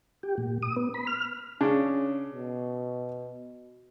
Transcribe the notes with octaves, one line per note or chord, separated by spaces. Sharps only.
G4
A#2
D#6
B3
B5
F6
C#3 C#4 D4
B2